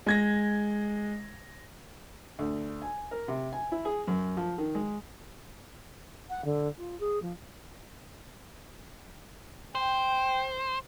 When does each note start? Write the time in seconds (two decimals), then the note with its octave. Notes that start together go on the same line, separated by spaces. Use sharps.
0.06 G#3 G#6 A#6
2.39 D2
2.82 G#5
3.11 A#4
3.28 C3
3.53 G#5
3.72 E4
3.85 G#4
4.07 F#2
4.37 F3
4.58 D#3
4.75 G#3
6.30 F#5
6.45 D3
6.78 F4
7.00 G#4
7.22 F3
9.75 C5 G5